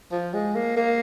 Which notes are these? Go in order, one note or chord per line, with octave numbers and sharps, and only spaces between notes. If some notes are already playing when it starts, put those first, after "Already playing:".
F3
G#3
A#3
A#3